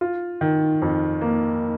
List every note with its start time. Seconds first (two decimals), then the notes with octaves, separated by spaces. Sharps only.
0.01 F4
0.41 D#3
0.82 F2
1.21 A#3